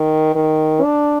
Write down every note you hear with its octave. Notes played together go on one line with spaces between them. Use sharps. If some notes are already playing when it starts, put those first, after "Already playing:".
Already playing: D#3
D#3
D4